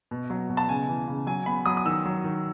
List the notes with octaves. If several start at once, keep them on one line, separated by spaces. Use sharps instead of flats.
B2
F#3
B2
A5
C#3 G#5
E3
C#3
F#3 G#5
B3 B5
F#3 D#6
D#6
D#3 E6
F#3
D#3